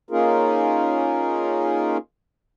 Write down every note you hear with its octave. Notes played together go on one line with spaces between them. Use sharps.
A#3 C#4 D#4 F4 G#4 A#4